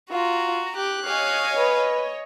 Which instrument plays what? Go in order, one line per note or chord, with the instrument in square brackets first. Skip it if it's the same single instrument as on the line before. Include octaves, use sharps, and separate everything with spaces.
[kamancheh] F4 [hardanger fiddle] F#4 A#5
[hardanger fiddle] G4 [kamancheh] F#6
[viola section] C#5 D#5 [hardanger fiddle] F5 G#5
[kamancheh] B4